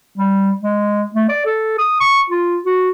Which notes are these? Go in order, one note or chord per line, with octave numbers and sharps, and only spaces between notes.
G3
G#3
A3
D5
A4
D#6
C#6
F4
F#4